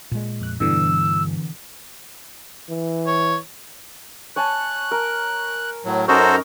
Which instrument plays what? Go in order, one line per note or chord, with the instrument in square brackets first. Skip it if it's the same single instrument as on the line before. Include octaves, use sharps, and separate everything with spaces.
[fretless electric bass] A#2 G#3
[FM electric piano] F2 F#6
[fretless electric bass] G2 [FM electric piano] B2 D3 E3 [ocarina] E6
[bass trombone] E3
[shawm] C#5
[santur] C#5 G#5 A5 [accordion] F#6
[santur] A#4
[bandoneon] A2 F#3
[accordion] F#2 A#5 [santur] C#4 D#4 A#4 [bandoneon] F#4 A4 C5